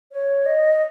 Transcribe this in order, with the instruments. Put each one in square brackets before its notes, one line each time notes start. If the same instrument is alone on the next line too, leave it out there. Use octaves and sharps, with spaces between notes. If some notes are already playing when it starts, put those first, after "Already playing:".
[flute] C#5
D#5